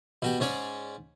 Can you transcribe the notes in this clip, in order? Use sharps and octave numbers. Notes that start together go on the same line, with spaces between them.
B2 F#4 G4
G#2 C#4 C#5 D5